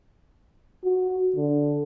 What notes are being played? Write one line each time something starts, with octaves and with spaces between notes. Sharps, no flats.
F#4
D3